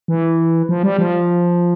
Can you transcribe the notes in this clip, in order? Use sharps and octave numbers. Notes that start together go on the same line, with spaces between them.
E3
F3
G3
F3